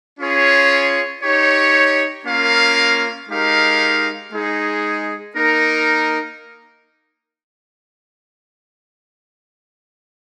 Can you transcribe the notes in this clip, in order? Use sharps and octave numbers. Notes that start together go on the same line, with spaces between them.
C#4 F4 G#4 C#5
D#4 G4 C#5
A#3 C#4 F4 A#4 F5
G#3 D#4 G4 A#4 F5
G#3 D#4 G#4
A#3 D#4 A#4